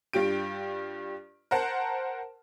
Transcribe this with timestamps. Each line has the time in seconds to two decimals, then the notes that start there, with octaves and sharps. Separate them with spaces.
0.13 G2 G3 F4 G4 D7
1.51 A#4 C5 F#5 A5